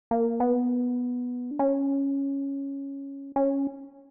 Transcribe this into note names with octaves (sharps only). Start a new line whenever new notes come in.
A#3
B3
D4
C#4
C#4